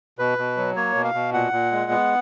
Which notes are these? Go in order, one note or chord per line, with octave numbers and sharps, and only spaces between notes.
B2 B4
B2
F#3
A#3 C#5
B2
F5
B2
A#2 F#5
A#2
G#3
B3